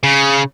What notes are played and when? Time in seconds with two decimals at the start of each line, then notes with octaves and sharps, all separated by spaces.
0.04 C#3